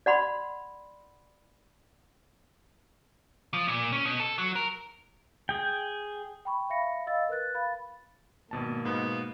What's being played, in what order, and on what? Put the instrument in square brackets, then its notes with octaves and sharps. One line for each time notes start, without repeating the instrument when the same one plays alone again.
[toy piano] D5 F#5 B5 C6
[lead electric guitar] F3
A#2
C#4
B2
A4
F#3
A#4
[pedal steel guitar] G#4 G5
[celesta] G5 B5 C#6
E5 F5 B5 A#6 C#7
D#5 F5 E6 A6
A#4 B4 F#6 A6
F5 B5 A6
[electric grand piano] G#1 B2 A5 [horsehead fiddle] A#3
[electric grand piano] G#2 B2 [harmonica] B3